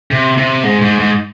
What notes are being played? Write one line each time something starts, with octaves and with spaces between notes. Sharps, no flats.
C3
C3
G#2
G#2
G#2